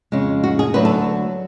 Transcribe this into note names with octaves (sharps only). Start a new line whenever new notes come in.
F2 C#3 G#3
F#4
G#4
D2 D3 F#3 B4
A4